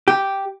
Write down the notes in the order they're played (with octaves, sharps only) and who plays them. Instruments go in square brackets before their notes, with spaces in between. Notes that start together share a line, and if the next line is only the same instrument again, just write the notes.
[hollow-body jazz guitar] G4